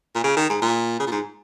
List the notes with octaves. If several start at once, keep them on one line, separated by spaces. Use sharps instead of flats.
A#2
C#3
D#3
G#2
A#2
C#3
A#2
G#2